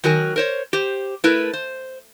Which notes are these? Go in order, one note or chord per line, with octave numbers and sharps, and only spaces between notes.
D#3 F#3 F#4 A#4 G#5
A#4 C5 C#5
G4 C5
A3 E4 A#4 B4
C5